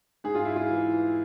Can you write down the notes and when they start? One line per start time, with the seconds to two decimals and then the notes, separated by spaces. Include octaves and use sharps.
0.24 G#2 G#4
0.35 F4
0.45 E4
0.56 F4
0.70 E3